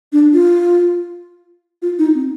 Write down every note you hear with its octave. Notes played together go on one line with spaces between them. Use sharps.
D4
F4
F4
D#4
C4